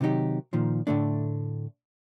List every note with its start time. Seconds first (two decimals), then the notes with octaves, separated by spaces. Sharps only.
0.01 C3 D#3 F#3 D#4 G4
0.53 A#2 D#3 F3
0.87 A2 D3 A3 D4